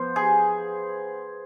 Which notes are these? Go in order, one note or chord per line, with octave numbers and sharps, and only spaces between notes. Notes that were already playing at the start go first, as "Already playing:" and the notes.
Already playing: F3 B3 C5
G#4